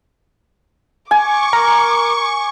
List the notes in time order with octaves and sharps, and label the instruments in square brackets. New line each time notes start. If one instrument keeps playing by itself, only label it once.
[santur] G#5 [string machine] C#6 [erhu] D6
[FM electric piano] A#4